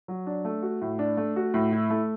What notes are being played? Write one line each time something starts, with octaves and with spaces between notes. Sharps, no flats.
F#3
D4
A3
F#4
A2
D4
A3
F#4
A2
E4
A3